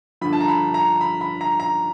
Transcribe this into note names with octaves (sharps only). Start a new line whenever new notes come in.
G2 D3 F3 B5
A5
A#5
B5
A#5
B5
B5
A#5
A#5